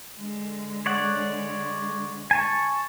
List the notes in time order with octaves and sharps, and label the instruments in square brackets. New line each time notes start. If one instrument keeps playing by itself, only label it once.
[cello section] D3 G#3
[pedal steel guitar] C#5 D5 F#5
G#5 A5 C#6